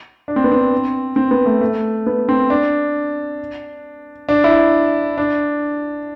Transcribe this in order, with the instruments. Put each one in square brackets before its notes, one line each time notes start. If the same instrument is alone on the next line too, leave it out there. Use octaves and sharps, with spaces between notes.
[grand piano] D4
C4
B3
C4
C4
B3
A3
A3
B3
C4
D4
D4
E4
D4